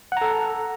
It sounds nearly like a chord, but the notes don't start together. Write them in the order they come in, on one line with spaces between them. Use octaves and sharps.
F#5 A#5 A4